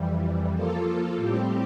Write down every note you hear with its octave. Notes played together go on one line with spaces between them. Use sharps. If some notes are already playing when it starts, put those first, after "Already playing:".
Already playing: F2 E3 G3
F3 A#3 F4 A4
A2 G3 C4 G4